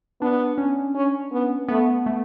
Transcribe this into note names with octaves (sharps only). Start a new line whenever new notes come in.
B3 D4
C#4
C#4
B3
A3 B3
A3